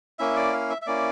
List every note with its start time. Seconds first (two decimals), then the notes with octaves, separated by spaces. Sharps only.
0.19 A#3 C#4 E4 E5
0.36 D5
0.53 F5
0.70 E5
0.82 E5
0.86 A#3 C#4 E4 D5